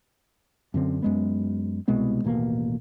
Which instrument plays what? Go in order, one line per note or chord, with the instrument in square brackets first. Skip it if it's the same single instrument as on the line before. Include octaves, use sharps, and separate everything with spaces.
[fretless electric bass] F#2 D3 C4
F#2 G#3 B3
C2 B2 G#3 B3
D#1 A1 B2 A#3